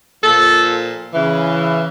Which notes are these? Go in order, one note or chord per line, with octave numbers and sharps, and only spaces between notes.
A#2 F3 A4
C#3 E3